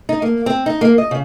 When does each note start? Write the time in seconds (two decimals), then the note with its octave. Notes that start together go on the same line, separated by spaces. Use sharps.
0.09 D#4
0.22 A#3
0.46 C4
0.66 D#4
0.81 A#3
0.98 D#5
1.11 C#3